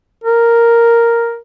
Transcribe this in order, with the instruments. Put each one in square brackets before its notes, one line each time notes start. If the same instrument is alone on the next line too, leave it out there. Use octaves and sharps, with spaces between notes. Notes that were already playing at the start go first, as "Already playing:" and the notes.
[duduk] A#4